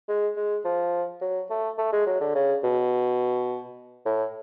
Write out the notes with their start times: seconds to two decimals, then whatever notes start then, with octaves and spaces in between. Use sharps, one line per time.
0.08 G#3
0.37 G#3
0.65 F3
1.21 F#3
1.50 A3
1.78 A3
1.93 G#3
2.06 F#3
2.21 D3
2.35 C#3
2.64 B2
4.05 A2